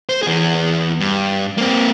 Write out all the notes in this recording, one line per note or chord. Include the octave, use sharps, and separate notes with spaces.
C5
E2 G#4
G2
A#3 C4